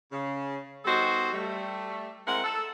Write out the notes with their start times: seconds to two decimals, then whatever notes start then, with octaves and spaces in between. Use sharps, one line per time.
0.12 C#3
0.85 G3 B3 D#4 F#4 A4 C5
1.33 G3 A3
2.27 G#3 C4 E4 A#4 F#5
2.44 A4